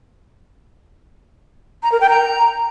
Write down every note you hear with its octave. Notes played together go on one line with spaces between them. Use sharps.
A#5
A#4
G5
A#5